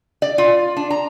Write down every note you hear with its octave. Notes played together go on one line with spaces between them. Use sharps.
D5
F4
D4
A#5